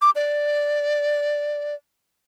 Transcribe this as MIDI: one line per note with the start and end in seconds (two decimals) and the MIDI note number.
0.01 0.10 86
0.16 1.75 74